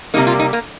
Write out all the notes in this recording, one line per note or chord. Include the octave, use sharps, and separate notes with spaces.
C3 G3 A#3 D#4
F4
D#4
A#3